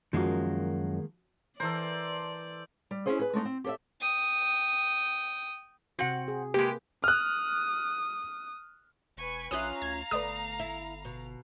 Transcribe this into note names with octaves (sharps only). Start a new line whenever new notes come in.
F#2 D#3 F3 G#3 A#3 F#4
E3 A4 A#4 C5 D5
G3
C#4 E4 G#4 C5 D#5
G#4 B4
G#3 A3 D4 D#4
C4
G4 A4 C5 D5 E5
G5 D#6
C3 C4 F#4 F#5
G#4
C3 G#3 A#3 G4 B4
D#6 F6 F#6
E1 B4 G#5 C#6
A#1 C#4 F4 E5 F5 A#5 D#6 F#6
D2 G#6
G1 A3 B4 D5 D#6
E4
B2